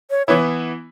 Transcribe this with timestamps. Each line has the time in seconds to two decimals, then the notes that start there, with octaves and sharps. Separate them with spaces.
0.10 C#5
0.27 E3 B3 E4 C#5